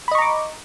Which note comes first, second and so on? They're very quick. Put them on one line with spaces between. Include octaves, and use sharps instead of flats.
B5 D#5 C#6 A#5 D6